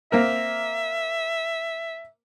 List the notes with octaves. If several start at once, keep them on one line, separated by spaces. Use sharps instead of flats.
A#3 C4 A#4 E5